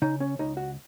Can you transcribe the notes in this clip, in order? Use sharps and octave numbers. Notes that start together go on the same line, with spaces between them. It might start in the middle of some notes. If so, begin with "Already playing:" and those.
C#3 D#4
C#4
C#2 D#4
F#4